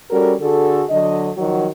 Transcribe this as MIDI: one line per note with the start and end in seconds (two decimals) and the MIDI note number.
0.11 0.34 55
0.11 0.34 61
0.11 0.34 66
0.11 0.34 69
0.11 0.34 70
0.40 0.84 50
0.40 0.84 66
0.40 0.84 68
0.40 0.84 69
0.90 1.30 50
0.90 1.30 54
0.90 1.30 69
0.90 1.30 75
1.37 1.66 51
1.37 1.66 53
1.37 1.66 54
1.37 1.66 66